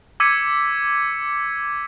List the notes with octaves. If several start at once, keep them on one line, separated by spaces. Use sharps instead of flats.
D6 E6 G#6 B6 C#7 D#7